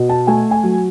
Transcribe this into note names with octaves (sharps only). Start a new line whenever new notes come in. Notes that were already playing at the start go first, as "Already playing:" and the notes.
Already playing: B2
A5
A3 G#5
G#5
F#3